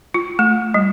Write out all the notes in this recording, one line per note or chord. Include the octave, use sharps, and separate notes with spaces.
F4
A3
G3